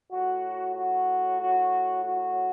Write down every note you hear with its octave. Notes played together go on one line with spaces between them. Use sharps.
A2 F#3 F#4
F#4
F#4
F#4